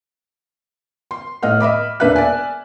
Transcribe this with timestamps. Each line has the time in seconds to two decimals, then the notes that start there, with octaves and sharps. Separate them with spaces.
1.11 C6
1.43 A2 D#5 F#5 F6
1.60 D#5 E5 B5 D6
2.00 E1 A#3 D4 B4 E5 F#6
2.16 D5 E5 G#5